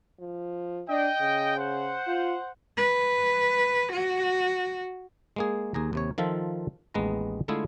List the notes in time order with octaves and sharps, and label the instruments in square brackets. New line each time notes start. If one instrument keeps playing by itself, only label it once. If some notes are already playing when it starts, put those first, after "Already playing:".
[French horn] F3
[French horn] D4 [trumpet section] D#5 G5
[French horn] C#3
[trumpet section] C5 F#5
[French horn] F4
[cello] B4
F#4
[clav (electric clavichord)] G#3 A#3 G#4
D#2 G#4 A#5
D#2 C3 C#5
D#3 F3 F4 A4 E5
A1 D#2 G#3 B3 B4 A#5
D3 G#3 A3 E4 F4 G#4